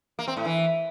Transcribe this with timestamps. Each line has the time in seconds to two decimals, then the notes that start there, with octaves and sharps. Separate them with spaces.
0.19 A#3
0.28 C4
0.37 A2
0.46 E3